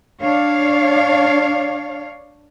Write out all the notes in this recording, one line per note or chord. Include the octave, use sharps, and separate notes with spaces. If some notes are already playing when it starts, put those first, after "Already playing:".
D4 C#5 F5